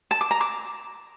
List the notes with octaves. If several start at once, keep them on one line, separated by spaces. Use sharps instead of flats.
A5
D6
A#5
D6